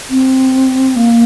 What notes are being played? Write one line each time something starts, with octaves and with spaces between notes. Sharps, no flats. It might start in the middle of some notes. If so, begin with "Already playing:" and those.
C4
A#3